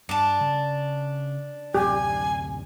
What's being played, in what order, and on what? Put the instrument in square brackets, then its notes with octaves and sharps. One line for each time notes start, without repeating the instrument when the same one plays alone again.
[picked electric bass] G2 [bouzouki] D4 A5
[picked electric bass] C#3
[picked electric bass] D1 F#2 C3 [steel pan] G4 [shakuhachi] G#5